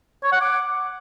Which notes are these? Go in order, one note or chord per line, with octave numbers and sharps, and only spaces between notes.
C#5
F#5
D6